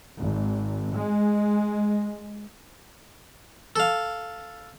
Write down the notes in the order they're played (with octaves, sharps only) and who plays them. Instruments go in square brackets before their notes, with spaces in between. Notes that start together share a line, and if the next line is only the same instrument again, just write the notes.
[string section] G#1
G#3
[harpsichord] A4 F5